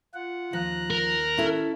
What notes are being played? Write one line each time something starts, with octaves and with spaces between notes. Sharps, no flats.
F4 F#5
D#2 F3 A#5 F#6
A#4
C#4 E4 A4